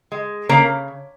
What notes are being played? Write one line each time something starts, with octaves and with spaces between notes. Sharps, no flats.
G#3
C#3 A#3